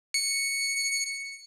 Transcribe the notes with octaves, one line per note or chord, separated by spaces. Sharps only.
C#7